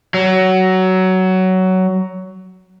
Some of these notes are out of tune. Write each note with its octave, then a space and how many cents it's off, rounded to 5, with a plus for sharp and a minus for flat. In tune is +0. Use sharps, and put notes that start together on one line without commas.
F#3 +15